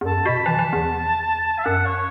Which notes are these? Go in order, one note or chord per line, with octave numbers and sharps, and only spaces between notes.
E2
F#2 A5
B2 B5
E3 A5
E3
E2
E5
F#2 F#5
C#5